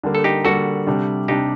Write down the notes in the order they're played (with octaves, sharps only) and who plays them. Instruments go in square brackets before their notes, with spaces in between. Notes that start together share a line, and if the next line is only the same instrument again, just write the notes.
[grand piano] D3 G3 A#3
[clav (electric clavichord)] A4
D#4 G4
[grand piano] D3 G3 A#3 [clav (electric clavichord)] F#4 A4
[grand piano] C3 G3 D4
[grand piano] C3 G3 D4 [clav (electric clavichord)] D#4 G4